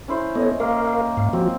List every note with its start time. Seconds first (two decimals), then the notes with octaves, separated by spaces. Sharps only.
0.08 C#4 E4 C5
0.35 B3 A4 C#5 D#5
0.60 A#3 A#4 F5
1.17 G#2 F5
1.33 F3 C4 F#4